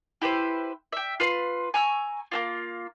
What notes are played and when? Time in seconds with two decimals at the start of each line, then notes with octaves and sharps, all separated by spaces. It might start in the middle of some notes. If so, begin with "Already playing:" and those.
0.22 E4 G4 B4 C5
0.92 E5 G5
1.20 F4 B4 C6
1.74 G#5 A#5 C#6 E6
2.32 A#3 C4 F4